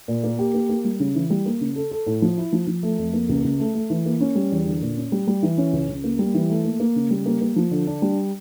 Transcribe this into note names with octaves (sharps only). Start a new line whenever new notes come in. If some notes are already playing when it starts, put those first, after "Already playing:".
A#2
A#3
G4
A#3
A#3
G3
C#3
E3
G3
A#3
C#3
A4
A4
A2
F3
E4
F3
F3
A3
F2
A#3
C#2
C#2
A3
A3
E3
A#3
C#4
G3
E2
D3
A#2
C#4
G3
G3
E3
C#4
C#2
C#2
A#3
G3
E3
A3
A#3
A#3
C#3
G3
A#3
A#3
F3
D3
D4
G3